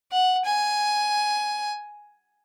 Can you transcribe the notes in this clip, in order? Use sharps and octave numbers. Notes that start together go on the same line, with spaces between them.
F#5
G#5